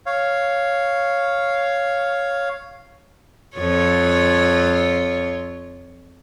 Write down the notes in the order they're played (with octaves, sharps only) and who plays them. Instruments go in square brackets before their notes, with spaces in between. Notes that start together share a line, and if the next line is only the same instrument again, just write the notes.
[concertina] C#5 F5
[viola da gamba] F2 F4 C#5